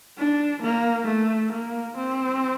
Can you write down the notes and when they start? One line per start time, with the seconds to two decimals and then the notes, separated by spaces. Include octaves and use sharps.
0.18 D4
0.62 A#3
1.07 A3
1.52 A#3
1.97 C4